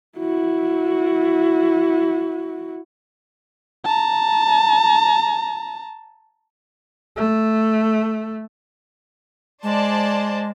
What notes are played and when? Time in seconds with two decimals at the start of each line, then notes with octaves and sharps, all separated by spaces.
0.18 E4 F#4
3.84 A5 A#5
7.17 A3
9.63 G#3 C5 D5 A5